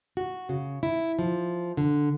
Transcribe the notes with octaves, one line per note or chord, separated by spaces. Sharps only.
F#4
C#3
E4
F3
D3